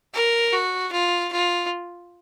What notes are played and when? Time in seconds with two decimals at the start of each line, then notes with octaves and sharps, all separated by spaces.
0.14 A#4
0.53 F#4
0.92 F4
1.32 F4